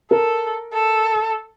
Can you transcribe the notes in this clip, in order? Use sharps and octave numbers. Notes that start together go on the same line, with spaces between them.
A4 A#4
A4